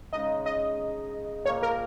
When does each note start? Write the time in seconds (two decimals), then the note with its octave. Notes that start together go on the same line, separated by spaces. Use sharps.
0.13 C#3 G#3 D#4 D#5
0.46 D#5
1.46 A#2 F3 A#3 C#5
1.63 A#4